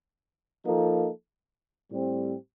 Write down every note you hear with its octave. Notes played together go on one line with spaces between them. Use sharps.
F3 A#3 D#4 A4
A2 G3 C4 G4